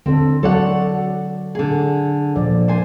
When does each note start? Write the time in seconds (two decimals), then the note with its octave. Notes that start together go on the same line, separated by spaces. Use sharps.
0.06 D3 C4 A4
0.43 F#3 A4 C#5 D5 F#5
1.55 D3 G#4
2.36 A#2 F3 D5
2.68 C5 G#5